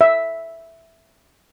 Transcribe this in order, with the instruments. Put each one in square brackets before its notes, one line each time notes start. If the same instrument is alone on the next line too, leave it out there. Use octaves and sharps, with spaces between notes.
[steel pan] E5